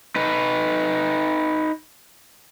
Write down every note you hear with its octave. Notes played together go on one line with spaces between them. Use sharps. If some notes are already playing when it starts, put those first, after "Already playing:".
D#4 B4